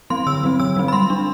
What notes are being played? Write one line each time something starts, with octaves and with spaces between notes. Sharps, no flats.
F#3 C4 C6
D3 E6
F#3 C4
D3 E6
F#3 C4
B5
G3 C6
D4